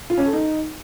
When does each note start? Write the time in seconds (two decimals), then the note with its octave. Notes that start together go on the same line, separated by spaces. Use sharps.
0.10 F4
0.18 C#4
0.25 A4
0.33 D#4